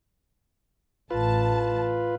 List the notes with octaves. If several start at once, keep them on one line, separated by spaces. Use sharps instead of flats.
A1 F4 B4 A5